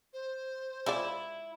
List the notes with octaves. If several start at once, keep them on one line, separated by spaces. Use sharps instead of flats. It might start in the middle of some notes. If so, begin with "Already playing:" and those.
C5
G#3 E4 F4 D5